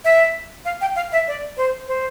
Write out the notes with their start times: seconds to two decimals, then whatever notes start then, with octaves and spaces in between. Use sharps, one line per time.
0.05 E5
0.65 F5
0.81 G5
0.96 F5
1.12 E5
1.28 D5
1.57 C5
1.88 C5